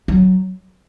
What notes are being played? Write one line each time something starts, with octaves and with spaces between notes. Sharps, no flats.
F#3